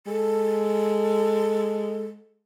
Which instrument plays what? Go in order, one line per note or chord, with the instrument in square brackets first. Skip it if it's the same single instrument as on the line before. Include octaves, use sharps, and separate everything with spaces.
[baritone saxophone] G#3 [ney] A4